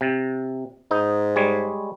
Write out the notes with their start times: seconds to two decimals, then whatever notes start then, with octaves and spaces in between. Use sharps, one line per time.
0.01 C3
0.91 G#2 D#4
1.36 G3 G#3 C#5